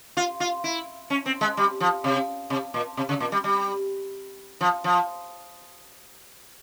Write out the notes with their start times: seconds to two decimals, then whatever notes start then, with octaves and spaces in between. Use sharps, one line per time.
0.17 F4
0.40 F4
0.64 E4
1.10 C#4
1.26 C4
1.41 G#3
1.57 G3
1.80 F3
2.04 C3
2.50 C3
2.74 A#2
2.97 C3
3.09 C#3
3.20 A#2
3.32 G3
3.44 G3
4.61 F3
4.84 F3